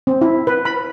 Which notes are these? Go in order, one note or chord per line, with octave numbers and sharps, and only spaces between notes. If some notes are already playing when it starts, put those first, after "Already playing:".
C4
E4
B4
B5